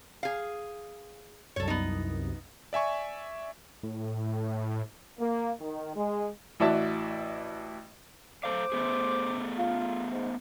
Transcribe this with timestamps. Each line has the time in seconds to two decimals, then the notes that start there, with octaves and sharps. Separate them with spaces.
0.23 G#4 F5
1.56 C2 F#2 A4 C#5
1.68 B3 D#4
2.73 D5 E5 G#5 C#6
3.83 A2
5.19 A#3
5.61 D#3
5.96 G#3
6.60 A1 E4 F#4 D5 E5 A5
8.44 A3 A4 C5 F5 D6
8.72 A3 B3 G#4
9.57 F4
10.12 G#2